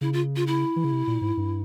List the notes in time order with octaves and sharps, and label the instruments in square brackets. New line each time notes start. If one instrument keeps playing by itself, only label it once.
[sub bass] C#3 [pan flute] E4
[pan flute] F4
F4
E4
[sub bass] E3
C#3
C3
A#2
G#2
G2